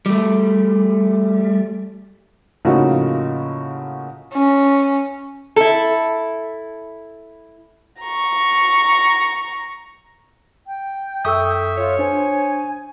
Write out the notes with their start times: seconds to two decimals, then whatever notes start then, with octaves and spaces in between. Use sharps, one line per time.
0.06 G3 A3
2.65 A2 C#3 F3 A#3 D#4 F#4
4.33 C#4
5.56 E4 A4
8.01 A#5 C#6
10.67 G5
11.25 F#2 A4 E5 C#6 D#6 E6 G6
11.77 F4 C#5
11.99 D4 C5 G#5